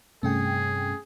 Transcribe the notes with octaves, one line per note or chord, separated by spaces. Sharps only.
G2 C3 A3 C#4 G#4 G5